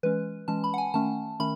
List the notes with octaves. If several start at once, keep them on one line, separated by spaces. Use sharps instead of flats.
E3 G#3 C#4 B4
E3 G#3 C#4 A5
B5
F#5
G#5
D#3 A3 C#4 A5
D#3 A3 C#4 B5